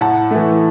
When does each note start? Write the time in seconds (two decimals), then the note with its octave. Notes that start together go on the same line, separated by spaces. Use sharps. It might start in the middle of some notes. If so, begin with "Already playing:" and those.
0.01 A2 F#5 A5
0.31 E3 A3